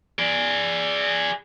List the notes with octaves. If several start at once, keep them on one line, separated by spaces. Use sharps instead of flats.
G#4 D5